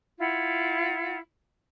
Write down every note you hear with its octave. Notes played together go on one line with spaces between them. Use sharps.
E4 F4 F#5